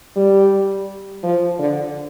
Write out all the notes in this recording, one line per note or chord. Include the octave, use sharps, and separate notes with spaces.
G3
F3
D3